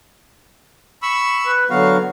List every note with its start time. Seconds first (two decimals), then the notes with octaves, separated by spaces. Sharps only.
1.02 B5 C#6 E6
1.47 B4
1.70 D3 F#3 B3 F#4 F5